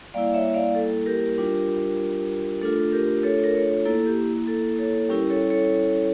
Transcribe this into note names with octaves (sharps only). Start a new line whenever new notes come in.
G3 A#3 E4 D5 F5
C#5 E5
D5 F5
A4
G4 A#4
G3 D4 F4
A3 D4 F4 A4
G4 A#4
A4 C#5
A#4
A4 C#5
A#3 E4 A4
G4
A4
A4 C#5
G3 C#4 E4 G4 A#4
A4 C#5
A4 C#5